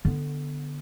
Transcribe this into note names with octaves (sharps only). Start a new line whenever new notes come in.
D3 B3